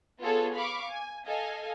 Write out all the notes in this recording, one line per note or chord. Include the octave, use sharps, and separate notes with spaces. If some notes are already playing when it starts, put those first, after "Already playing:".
B3 F4 G#4 A4 C#5
F5 B5 C#6 D6
G#5
A4 D#5 F5 G#5